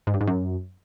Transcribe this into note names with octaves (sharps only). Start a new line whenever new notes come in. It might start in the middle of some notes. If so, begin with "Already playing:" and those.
G#2
G2
G#2
F#2